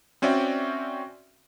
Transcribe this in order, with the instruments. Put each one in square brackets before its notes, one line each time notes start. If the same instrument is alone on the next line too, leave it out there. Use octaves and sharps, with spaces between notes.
[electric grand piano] C4 C#4 F#4 D5 E5 G5